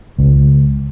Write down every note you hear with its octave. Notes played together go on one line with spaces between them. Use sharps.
C#2